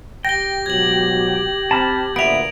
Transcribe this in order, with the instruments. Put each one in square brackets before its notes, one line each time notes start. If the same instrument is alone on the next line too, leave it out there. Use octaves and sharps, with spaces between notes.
[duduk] G4 [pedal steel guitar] G5 [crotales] A#6 G7
[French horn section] G#2 B2 F#3 [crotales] G#6 F#7
[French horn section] C4 [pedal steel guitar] A5 B5 F6
[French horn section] D2 A#2 [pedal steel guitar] B3 E5 [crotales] D7 F7